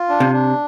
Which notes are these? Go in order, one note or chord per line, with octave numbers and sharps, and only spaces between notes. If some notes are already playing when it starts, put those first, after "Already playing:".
Already playing: F4
D4
C3
D4